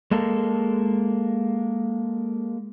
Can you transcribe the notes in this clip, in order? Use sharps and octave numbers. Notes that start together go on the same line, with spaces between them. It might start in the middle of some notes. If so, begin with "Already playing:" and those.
G#3 A#3 A4